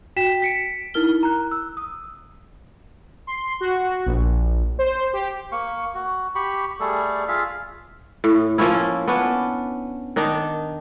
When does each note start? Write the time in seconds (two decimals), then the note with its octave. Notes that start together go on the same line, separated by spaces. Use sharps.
0.16 F#4 G5 B6 E7
0.42 B6 C#7 D7
0.94 D#4 E4 A#4 F6 G7
1.23 A#5 F#6
1.51 E6
1.77 D#6
3.27 C6
3.61 F#4
4.06 A#1
4.79 C5
5.13 G4
5.52 A#3 C#6
5.95 F#4
6.35 G4 B5 C#6
6.80 G3 A3 G#4 A4
7.28 F4 G#4 E5 F5
8.24 A2
8.58 F3 A#3 C#4 E4
9.08 B3 C#4 D4
10.16 D#3 D4 D#4